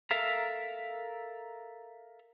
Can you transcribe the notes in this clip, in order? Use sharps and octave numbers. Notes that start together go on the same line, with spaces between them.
A4 A#4 E5 F5 A#5